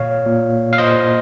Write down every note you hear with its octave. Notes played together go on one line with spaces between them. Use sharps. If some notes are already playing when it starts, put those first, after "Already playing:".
Already playing: A#2 C#5 F5
A#2
F5
A#2 C5 D#5